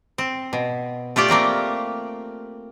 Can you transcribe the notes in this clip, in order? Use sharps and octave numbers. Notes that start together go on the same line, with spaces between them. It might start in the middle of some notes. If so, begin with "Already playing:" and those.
C4
B2
A3 F4 G4 D5
A3 A#3 C4 G5